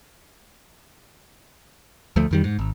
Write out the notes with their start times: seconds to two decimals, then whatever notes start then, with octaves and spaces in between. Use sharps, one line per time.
2.16 D2 F3 A3
2.31 F2 D#3 G3
2.44 G#2
2.59 G#1